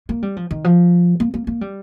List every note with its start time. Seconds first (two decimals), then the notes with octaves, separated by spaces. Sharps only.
0.09 A#3
0.22 G3
0.37 F3
0.51 D#3
0.64 F3
1.20 A#3
1.34 A#3
1.47 A#3
1.61 G3